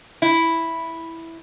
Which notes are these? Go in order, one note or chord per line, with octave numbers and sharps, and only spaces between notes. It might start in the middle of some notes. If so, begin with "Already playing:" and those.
E4